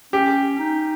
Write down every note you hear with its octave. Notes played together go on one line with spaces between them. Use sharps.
C#4 G4
D#4